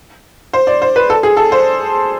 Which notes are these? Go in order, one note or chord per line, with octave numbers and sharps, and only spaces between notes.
C5
D5
C5
B4
A4
G#4
A4
C5